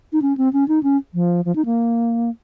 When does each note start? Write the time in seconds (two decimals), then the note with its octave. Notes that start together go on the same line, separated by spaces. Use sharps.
0.13 D#4
0.22 C#4
0.38 C4
0.53 C#4
0.68 D#4
0.83 C#4
1.14 F3
1.45 F3
1.56 D#4
1.65 A#3